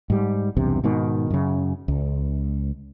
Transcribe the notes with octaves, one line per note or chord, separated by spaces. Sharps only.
G#2 G3
B1 E2 G2 C3
G#2 B2 D#3
F#2 C#3
C#2